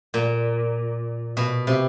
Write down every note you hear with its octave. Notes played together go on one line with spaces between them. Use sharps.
A#2
B2
C3